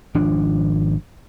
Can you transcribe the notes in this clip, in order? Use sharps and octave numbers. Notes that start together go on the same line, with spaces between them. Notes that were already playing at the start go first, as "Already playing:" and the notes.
G#1 F3 D4